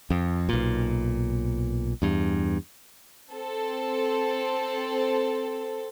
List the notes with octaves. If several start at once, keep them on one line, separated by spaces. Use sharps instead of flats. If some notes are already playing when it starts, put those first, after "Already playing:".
F2
B1 A#2
E2 G2
C4 A4